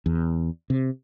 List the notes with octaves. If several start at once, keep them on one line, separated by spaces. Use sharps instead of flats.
E2
C3